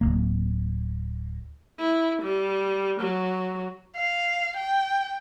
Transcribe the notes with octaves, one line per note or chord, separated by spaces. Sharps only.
D1 G#1 A#3
E4
G3
F#3
F5
G5